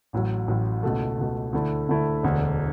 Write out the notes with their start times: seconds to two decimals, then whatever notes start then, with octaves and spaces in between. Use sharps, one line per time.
0.13 A1 A2 F#3
0.48 A1 A2 F#3
0.83 C#2 B2 A3
1.18 C#2 B2 A3
1.53 D2 D3 A3 E4
1.89 D2 D3 A3 E4
2.23 E1 D2 D3